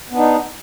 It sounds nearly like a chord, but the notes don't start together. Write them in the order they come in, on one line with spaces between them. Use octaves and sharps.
B3 D4 D#4